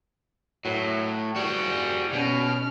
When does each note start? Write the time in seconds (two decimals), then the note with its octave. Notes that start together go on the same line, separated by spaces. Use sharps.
0.65 A2 F#3
1.36 G3 F#4 G#4
2.12 B2 C#4 F6